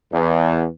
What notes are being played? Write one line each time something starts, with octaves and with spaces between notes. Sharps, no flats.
E2